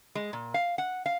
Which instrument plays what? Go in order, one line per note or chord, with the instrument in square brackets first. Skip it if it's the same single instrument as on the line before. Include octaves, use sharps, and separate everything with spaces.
[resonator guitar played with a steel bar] G#3
A#2
F5
F#5
F5